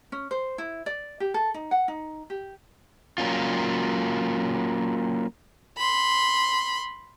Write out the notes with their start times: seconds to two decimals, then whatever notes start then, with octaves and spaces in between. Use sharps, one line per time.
0.12 C#4
0.31 C5
0.58 E4
0.86 D5
1.20 G4
1.34 A4
1.54 D#4
1.71 F#5
1.88 D#4
2.30 G4
3.18 F#3 A#3 C#4 F4
5.77 B5 C6